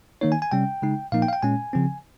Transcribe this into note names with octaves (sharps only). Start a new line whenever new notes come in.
D#3 A#3 D#4 C#5
G#5
G#5
C3 G3 C#4 G5
C#3 G#3 D#4
A#2 F3 A#3 D#4 F5
G5
F5
G5
A#2 G#3 C#4 G#5
C#3 F3 C4